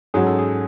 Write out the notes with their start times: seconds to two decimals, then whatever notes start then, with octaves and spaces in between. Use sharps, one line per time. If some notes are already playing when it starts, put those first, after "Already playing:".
0.14 G#2 F#3 C#4 F#4 G#4
0.27 A4
0.39 G#4